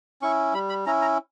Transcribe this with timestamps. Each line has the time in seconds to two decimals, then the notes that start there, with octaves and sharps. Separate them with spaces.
0.22 C#4 E4 C#6
0.53 G3 B5
0.69 B5
0.86 C#4 E4 A#5
1.02 A#5